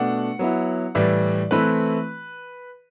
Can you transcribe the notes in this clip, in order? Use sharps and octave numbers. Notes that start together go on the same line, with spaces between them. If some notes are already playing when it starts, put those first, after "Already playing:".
Already playing: B2 A3 D4 F#5
F#3 B3 E4
A2 E3 G3 D5
E3 A3 C4 E4 B4